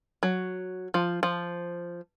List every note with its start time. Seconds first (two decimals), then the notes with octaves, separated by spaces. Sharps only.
0.23 F#3
0.94 F3
1.23 F3